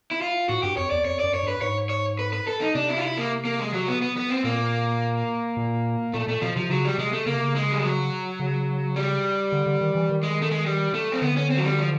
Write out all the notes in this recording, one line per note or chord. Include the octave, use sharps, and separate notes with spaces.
E4
F4
A2 F#4
G2 G4
F2 C#5
E2 D5
F2 C#5
F#2 D5
C#5
G2 B4
G#2 C#5
C#5
B4
B4
A4
D#4
C3 D4
E4
F4
E4
A#3
A#3
G#3
F#3
B3
B3
B3
C4
A#2 A#3
A#2
A#2 A3
A#2 A3
B2 F3
C3 F3
C#3 F#3
G3
C3 G#3
A3
C#3 A#3
C3
C#3
G#3
G3
F#3
C#3
G3
D3
D3
D#3
E3
D#3
G#3
A3
G#3
G3
A3
C4
D3 B3
C#4
C4
F#3
G3
F3